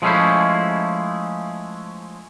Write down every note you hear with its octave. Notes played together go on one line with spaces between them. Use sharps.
F3 G#3 A3 C#4 E4 C5